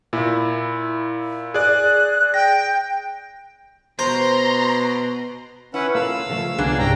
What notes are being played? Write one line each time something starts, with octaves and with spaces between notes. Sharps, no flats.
A#2 E4
G#4 D5 F#6
G5 A#6
B2 C5 A#5 C6
C#4 E4 B4 F#5
A#3 F4 A4 F5 E6
C#3 F3 A3
C2 D3 F3 A#3 B3 D4 G#4
C2 G2 C#3 C#4 G4 G5 A#5